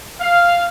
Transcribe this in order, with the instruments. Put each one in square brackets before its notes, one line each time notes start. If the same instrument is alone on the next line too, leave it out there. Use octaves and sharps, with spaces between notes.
[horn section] F5